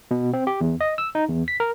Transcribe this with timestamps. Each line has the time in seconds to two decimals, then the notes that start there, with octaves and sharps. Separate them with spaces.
0.11 B2
0.33 C4
0.47 G4
0.61 E2
0.81 D#5
0.98 E6
1.15 D#4
1.29 E2
1.48 B6
1.60 A#4